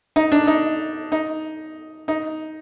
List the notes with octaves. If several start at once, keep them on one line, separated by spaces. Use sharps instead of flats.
D#4
D4
D#4
D#4
D#4